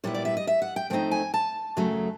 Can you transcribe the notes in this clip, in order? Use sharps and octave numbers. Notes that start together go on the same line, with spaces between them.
A#2 G3 B3 E4 C#5
D5
E5
D#5
E5
F#5
G5
A2 F3 A3 C4 D#4 G5
G#5
A5
F#2 C#3 F#3 A3